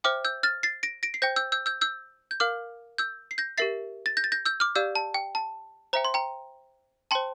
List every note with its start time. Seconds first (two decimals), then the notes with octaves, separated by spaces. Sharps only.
0.04 C5 E5 G5 D6 F6
0.25 E6 G6
0.43 F6 A6
0.63 A6 C7
0.83 A#6 D7
1.03 A#6 D7
1.14 C7
1.22 C5 G5 G6 A#6
1.36 E6 G6
1.52 E6 G6
1.66 E6 G6
1.81 E6 G6
2.31 G6
2.40 A#4 F5 D6 F6
2.98 E6 G6
3.31 C7
3.38 G6 A#6
3.58 G4 A#4 E5 A6 C7
4.06 A6
4.17 G6 A#6
4.24 A6
4.32 G6 A#6
4.46 E6 G6
4.60 D6 F6
4.75 G4 D5 F5 E6 G6
4.95 A5
5.14 G5
5.35 A5
5.93 C5 E5 G5 A#5
6.05 C6
6.14 G5 A#5
7.11 G5 A5 C6
7.15 C5